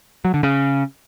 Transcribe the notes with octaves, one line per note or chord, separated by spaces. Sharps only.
F#3
D3
C#3